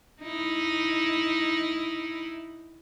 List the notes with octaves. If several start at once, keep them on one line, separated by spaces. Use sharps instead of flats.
D#4 E4